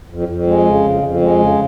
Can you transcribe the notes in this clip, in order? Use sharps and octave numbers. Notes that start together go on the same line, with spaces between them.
F2
F2
G#3
C#3
F2
F2
G#3
C#3